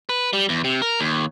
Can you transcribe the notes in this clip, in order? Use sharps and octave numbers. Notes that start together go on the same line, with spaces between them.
B4
G3
E2
C3
A#4
D#2